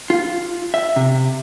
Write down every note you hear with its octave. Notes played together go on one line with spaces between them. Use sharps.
F4
E5
C3